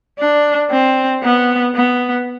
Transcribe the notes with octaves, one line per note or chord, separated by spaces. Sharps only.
D4
C4
B3
B3